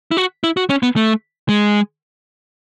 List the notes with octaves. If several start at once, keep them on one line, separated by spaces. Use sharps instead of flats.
E4
F#4
E4
F#4
C#4
B3
A3
G#3